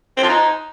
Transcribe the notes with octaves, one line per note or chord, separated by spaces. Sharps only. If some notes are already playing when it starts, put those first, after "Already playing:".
C4
F3
D#4